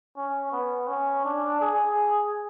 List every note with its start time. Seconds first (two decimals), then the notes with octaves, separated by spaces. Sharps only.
0.17 C#4
0.52 B3
0.88 C#4
1.25 D4
1.61 G#4